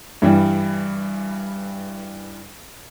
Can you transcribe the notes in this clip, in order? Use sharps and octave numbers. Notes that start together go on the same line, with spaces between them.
G2 E3 G3